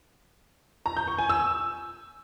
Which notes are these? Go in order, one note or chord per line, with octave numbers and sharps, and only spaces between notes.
A#5
G6
C#6
G#5
E6